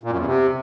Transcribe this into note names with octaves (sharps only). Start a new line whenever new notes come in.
A#2
F#2
E2
C3